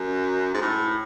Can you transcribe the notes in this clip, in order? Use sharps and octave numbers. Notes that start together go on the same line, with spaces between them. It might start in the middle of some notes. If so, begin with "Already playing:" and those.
Already playing: F#2
G#2
A2